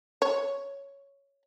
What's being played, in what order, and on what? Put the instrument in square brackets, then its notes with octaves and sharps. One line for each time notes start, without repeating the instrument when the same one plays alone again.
[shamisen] C#5